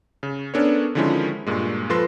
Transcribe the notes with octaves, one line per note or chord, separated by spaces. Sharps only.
C#3
B3 C#4 D4 A4 A#4 C#5
D3 D#3 F3 G#3 C#4 E4
G2 A#2 G#3
F3 A4 B4 C6 A#6